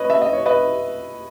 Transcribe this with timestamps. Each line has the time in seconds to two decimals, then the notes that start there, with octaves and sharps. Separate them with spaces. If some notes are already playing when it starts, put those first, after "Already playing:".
Already playing: B4 C#5 D#5
0.10 E5
0.22 D#5
0.33 C#5
0.46 B4 D#5